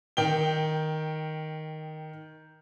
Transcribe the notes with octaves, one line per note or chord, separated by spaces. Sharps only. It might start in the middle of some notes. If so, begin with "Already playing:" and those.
D#3 G5 G7